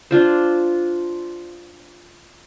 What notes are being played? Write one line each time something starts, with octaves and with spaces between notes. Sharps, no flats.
D4 F4 C5